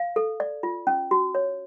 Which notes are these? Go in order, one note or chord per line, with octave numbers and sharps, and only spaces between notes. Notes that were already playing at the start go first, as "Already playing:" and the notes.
Already playing: F5
A4
D5
F4
C#4
F#4
C#5